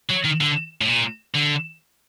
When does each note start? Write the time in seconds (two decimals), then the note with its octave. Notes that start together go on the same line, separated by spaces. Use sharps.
0.09 F#3
0.24 D#3
0.41 D3
0.81 A2
0.88 A#2
1.35 D3